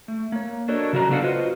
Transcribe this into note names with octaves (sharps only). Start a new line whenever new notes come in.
A3
A#3 C#5
D4 F#4 A4 A#4 C#5 D#5
C#3 F#3 F#4 D5 A#5
B3 D4 F#4 A4 F5 F#5
F4 F#4 B4 C5 D#5